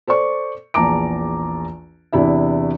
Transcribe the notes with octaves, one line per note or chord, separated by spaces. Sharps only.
A4 C5 D5 C#6
A#1 E2 A5 A#5 D6 D7
E2 C3 D4 E4 E5